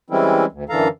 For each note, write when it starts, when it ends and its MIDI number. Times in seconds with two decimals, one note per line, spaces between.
0.10 0.45 52
0.10 0.45 55
0.10 0.45 56
0.10 0.45 60
0.10 0.45 61
0.10 0.45 64
0.52 0.64 38
0.69 0.88 42
0.69 0.88 50
0.69 0.88 52
0.69 0.88 69
0.69 0.88 77
0.69 0.88 82